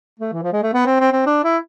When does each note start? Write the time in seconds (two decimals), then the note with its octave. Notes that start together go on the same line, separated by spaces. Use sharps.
0.20 A3
0.33 E3
0.43 F3
0.53 G#3
0.63 A3
0.73 B3
0.86 C4
1.00 C4
1.12 C4
1.26 D4
1.44 E4